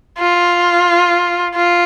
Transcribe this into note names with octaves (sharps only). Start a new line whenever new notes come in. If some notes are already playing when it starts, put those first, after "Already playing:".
F4
F4